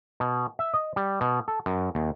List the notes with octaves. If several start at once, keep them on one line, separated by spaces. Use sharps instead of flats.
B2
E5
D#5
G3
B2
A4
F#2
D#2